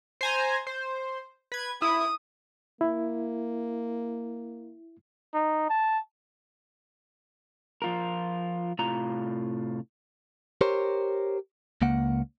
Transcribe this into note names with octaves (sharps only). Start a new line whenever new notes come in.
C5 G#5 A#5
C5
B4 G#6
E4 D#6
A#3 E4
D#4
A5
F3 F4 A#4
A2 C3 F4 A#5
G4 A#4 C5 C#5
C#2 A#3 F#5